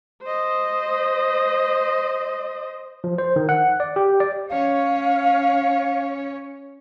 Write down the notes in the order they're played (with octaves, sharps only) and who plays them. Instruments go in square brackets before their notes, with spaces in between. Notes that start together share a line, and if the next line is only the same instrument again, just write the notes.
[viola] C5 D#5
[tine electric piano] F3
C5
D#3
F#5
D5
G4
D5
[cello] C#4 C#5 [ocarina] F5